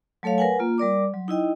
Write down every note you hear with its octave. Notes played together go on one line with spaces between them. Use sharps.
F#3 A3 A4 C#5 F5
A#4 B4 F#5 G#5
A#3 F4
G3 A#4 D5 D6
F#3
D#4 E4 D#5 G5